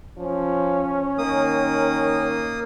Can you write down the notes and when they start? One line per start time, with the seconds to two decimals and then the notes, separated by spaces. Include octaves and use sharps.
0.18 F3 C#4
1.18 D#3 A#3 D#6